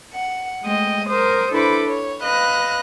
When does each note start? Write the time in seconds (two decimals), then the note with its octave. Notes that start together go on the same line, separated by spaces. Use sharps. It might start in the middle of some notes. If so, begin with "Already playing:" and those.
0.13 F#5
0.63 G#3 A3 D#5 G5
1.06 A#4 C5 D#6
1.51 D4 E4 A4 B4 C5 D6
1.87 C#5
2.22 B4 D#5 F5 F#6 A#6